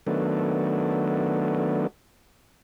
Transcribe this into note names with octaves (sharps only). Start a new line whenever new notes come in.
D#3 F#3 A3 B3 D4